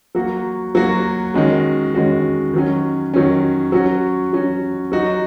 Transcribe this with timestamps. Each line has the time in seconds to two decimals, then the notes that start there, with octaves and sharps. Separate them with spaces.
0.15 F#3 A#3 F#4
0.75 F#3 A#3 F#4
1.34 D#3 G#3 C#4 F#4
1.94 D#3 G#3 C#4 F#4
2.53 D#3 F#3 C#4
3.14 D#3 F#3 C#4
3.72 F#3 C#4 F#4
4.33 F#3 C#4 F#4
4.92 F#3 D#4 F#4